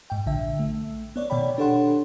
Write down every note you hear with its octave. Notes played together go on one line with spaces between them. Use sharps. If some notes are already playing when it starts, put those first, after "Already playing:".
G#2 G5
A#1 D3 E5
A3
B3 C#5 D5
B2 D#3 C#5 D5 G5 B5
D4 G4 A4 C#5 F#5 C6